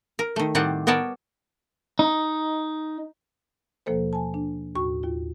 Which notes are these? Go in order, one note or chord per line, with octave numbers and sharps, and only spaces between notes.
A#4
D#3 A3
A2 D#3 G3 C4 D5 F#5
B3 A#4 C#5 D5 A5
D#4
D#2 B2 F3 A#3 A4 C5
G#5 A5
D4
D#2 A2 F#4 C#6
D#2 F4